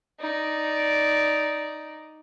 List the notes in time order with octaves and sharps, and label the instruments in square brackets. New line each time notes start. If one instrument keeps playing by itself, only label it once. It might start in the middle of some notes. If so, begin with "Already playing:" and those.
[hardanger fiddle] D#4 D5